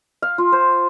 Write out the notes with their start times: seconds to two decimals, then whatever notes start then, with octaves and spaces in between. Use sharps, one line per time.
0.22 F5
0.38 F4
0.52 C5